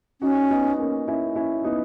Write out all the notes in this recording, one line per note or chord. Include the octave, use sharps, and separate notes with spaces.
C#4 D#4 F#4
B3 D#4
A#3 C#4
C#4 E4
C#4 E4
B3 D#4